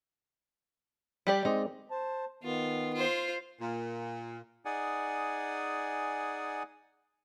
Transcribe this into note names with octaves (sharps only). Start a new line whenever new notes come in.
G3 G4 D5
G#3 C4 D#4 D5
C5 A5
D#3 B3 F4
F4 C5
A#2
D#4 G#4 D5 F#5 G#5